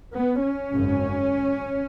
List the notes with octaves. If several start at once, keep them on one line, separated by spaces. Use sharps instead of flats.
B3
C#4
G#1 F#2 C#3